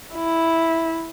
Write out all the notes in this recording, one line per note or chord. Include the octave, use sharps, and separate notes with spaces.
E4